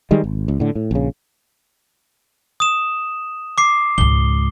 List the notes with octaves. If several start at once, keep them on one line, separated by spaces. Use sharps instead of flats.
D#3 G3 G#3
G#1
C#2
A2 D3
A2
A#1 C#3
D#6 E7
D6 C7
C#2 G#2 G7